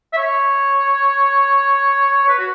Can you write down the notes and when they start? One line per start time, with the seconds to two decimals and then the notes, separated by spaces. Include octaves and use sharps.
0.13 E5
0.17 C#5
2.29 B4
2.39 F#4